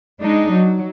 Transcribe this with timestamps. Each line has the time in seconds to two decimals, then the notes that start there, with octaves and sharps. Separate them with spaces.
0.20 G#3 D4 D#4
0.52 F#3